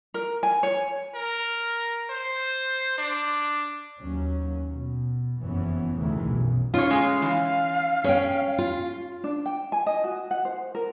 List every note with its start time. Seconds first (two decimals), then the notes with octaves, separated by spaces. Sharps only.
0.14 A#4
0.43 G#5
0.63 C#5
1.15 A#4
2.10 C5
2.98 D4
4.01 D#2 F#3 C#4
4.68 B2
5.41 F#1 F2 E3 B3 C#4
5.96 D2 A2 C3 D#3 E3 G#3
6.28 B1 F#2
6.74 C#4 F4 C#5
6.90 G#3 F5
7.22 E3
8.04 C#4 C#5 G5
8.58 F4
9.24 D4
9.46 G5
9.72 G#5
9.87 D#5
10.04 F#4
10.31 F#5
10.45 C5
10.75 A#4